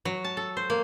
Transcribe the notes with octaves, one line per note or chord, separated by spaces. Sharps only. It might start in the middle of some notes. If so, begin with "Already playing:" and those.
F#3
A5
A4
C5
A#3